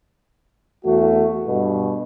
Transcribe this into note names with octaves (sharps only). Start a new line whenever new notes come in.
E2 A3 F#4
G2 B2